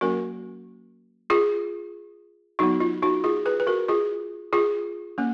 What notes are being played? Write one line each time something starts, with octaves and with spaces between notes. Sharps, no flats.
F#3 A#3 C#4 F#4 A#4
F4 G#4
F#3 B3 D#4 F#4
F4
D#4 F#4
F4 G#4
G#4 B4
B4
F#4 A#4
F4 G#4
F4 G#4
A#3 C#4